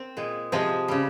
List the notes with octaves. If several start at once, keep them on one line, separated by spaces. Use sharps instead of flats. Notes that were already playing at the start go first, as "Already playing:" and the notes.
Already playing: A#3 C4
A#2 G#3
C3 F3 G#3 C4
C#3 G3